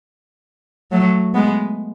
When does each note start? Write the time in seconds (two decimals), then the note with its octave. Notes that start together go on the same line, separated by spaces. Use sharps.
0.91 F#3 A3
1.34 G#3 B3